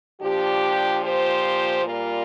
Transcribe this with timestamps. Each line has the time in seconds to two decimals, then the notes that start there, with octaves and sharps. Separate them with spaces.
0.21 A#2 F3 D4 G4
1.03 G4 C5
1.84 A#2 G3 F4 A#4